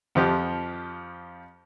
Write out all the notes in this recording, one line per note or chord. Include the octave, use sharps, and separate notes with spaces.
F2 F3 G4